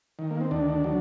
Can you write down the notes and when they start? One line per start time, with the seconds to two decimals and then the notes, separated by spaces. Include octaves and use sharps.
0.19 D#3
0.31 A#3
0.41 C4
0.51 D2 D4
0.84 F#3